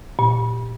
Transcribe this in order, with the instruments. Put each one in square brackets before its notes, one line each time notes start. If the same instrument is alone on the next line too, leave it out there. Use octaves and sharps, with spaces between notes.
[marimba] A#2